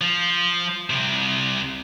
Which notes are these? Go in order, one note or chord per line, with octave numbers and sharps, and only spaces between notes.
F3
C2 C3